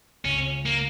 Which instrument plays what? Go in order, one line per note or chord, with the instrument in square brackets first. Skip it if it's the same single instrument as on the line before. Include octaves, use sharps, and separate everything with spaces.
[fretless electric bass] C#2 C#3 [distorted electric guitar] C#4
[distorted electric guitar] A#3